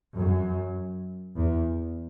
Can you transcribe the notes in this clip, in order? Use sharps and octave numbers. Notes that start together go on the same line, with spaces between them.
F#2
E2